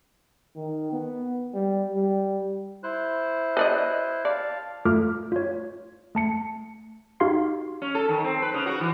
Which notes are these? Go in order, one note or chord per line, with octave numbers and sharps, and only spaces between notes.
D#3
B3
G3
G3
E4 C5 F#6
B4 D5 D#5
D5 F5 A5
A3 F4 A4 D6 F6
F4 C#5
A3 A5 C#7
D#4 F#4 G4 F5 C6 C7
C#4
A4
D#3
C4
B4
C#3
F#4
E3